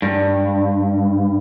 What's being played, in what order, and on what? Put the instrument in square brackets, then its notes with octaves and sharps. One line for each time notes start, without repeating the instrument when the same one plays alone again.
[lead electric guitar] G2